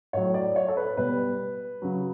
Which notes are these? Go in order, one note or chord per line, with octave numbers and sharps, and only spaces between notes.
A2 F#3 C#5
D5
C#5
A4
B4
B2 G3 B4
C#3 F#3